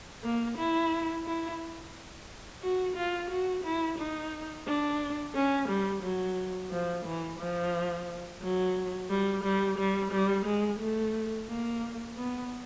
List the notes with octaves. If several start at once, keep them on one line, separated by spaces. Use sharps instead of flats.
A#3
E4
E4
F#4
F4
F#4
E4
D#4
D4
C#4
G3
F#3
F3
E3
F3
F#3
G3
G3
G3
G3
G#3
A3
A#3
B3